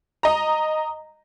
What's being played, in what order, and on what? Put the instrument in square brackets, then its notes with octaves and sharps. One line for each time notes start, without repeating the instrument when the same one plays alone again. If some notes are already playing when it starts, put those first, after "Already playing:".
[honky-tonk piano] D#5 A#5